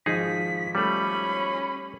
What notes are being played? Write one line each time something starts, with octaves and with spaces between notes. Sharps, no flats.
G#1 F3 D#4 G#4 D#5 B6
G3 A3 C#4 B5